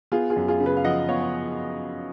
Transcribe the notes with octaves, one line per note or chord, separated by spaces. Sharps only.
B3 F4 G#4
F4 G#4
F#2
F4 G#4
C#3
G#4 B4
F5
F3 D#5 F#5
B3 C#5 F5
C#5